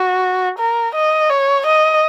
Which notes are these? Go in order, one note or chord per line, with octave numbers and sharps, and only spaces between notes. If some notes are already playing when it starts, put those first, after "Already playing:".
Already playing: F#4
A#4
D#5
C#5
D#5